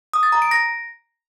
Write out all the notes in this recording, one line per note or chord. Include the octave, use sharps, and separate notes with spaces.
D#6
A6
A#5
D7
A#6